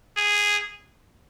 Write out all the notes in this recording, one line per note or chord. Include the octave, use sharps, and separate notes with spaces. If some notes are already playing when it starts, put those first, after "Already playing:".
G#4